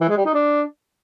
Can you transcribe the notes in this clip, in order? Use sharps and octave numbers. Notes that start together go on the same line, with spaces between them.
E3
G#3
G3
D#4
D4